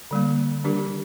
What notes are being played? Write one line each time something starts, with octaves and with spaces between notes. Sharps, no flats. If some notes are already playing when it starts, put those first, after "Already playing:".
D3 G3 A#3
D#3 G3 D4 G4 A#4